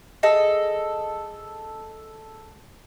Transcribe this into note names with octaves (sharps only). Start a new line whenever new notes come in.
G#4 A4 D#5